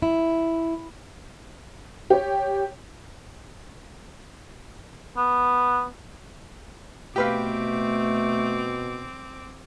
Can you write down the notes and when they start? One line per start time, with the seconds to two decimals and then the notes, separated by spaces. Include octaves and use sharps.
0.02 E4
2.10 G4 C#5
5.17 B3
7.16 B2 A3 C4 G4 B4 F5 D6